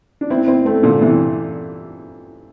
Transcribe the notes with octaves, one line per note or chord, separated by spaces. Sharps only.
D4
C4 E4
C4 E4
A3 C4
A#2 D3
C3 E3